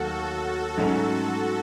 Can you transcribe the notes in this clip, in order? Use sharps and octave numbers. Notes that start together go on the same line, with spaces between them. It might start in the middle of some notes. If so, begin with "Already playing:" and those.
Already playing: D#2 D#3 F#3 A3 F#4 A4
G#2 F#3 A3 C#4